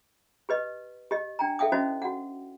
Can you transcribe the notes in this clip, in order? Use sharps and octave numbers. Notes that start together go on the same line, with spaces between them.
G4 B4 D#5
G4 D#5
D4 G5 A#5
A4 E5 F5 G5 D#6
C#4 E4 F#4 C5 D#5
F#4 F#5